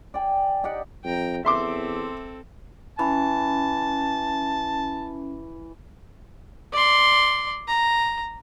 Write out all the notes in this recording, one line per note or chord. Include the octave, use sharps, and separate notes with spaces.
D5 G5 G#5
D#4 G4 D5 F#5
F2 G5 A#5
E2 C4 A4 E5 C6 D6
E3 C#4 A5
D5 C6
A#5